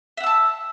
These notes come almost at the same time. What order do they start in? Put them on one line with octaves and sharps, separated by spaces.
E5 F#5 E6 A5